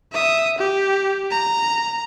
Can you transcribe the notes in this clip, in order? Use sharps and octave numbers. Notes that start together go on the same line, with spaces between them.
E5 D#6
G4
A#5